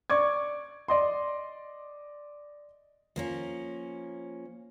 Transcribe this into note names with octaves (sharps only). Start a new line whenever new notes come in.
D5 C#6 D6 G#6
D5 D#5 C6
F3 A#3 C#4